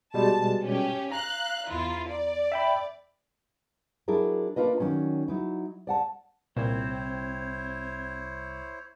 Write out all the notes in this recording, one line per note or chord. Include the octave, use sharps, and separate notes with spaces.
B2 G3 G#3 A5
C#4 G4
F5 A#5 F#6
E2 E4 F4
D5
E5 G5 B5
F#3 D4 E4 G#4 A#4
A#3 D4 F4 B4 D#5
D#3 F#3 C#4 D4
F#3 D#4 E4
D5 F#5 A5
C2 A#2 C4 E4 C5 C#5